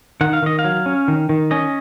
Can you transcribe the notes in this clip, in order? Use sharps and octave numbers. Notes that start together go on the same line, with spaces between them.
D#3 F#5
F5
D#3 D#5
F5
F#3
C#4
D#3
D#3
C#4 D#5